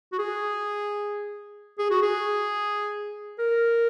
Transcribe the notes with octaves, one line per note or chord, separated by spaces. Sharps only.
F#4
G#4
G#4
F#4
G#4
A#4